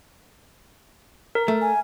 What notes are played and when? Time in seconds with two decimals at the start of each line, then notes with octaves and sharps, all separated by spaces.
1.35 A#4
1.48 A3
1.61 G#5